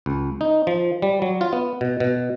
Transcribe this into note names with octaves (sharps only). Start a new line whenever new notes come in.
C#2
D#4
F3
G3
F#3
F4
B3
B2
B2